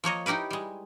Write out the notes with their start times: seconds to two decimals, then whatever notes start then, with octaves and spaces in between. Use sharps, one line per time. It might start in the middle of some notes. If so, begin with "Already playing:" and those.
0.04 F3 A#3 C#5 D#5
0.26 D#4 E4 G4 A#4 B4
0.50 G3 G#3